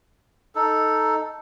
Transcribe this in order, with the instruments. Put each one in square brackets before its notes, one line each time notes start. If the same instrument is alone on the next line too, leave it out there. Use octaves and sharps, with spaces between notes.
[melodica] D#4 A4